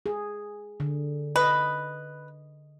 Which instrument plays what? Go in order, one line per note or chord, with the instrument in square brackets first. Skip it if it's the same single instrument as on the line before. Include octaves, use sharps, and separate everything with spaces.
[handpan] G#4
D3
[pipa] B4 [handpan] D#5